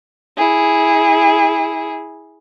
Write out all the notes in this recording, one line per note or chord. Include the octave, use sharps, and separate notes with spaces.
E4 G#4